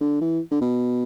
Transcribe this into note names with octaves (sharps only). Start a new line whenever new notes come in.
D3
E3
D3
B2